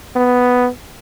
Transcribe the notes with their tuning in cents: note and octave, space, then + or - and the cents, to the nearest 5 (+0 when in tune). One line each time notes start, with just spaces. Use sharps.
B3 +5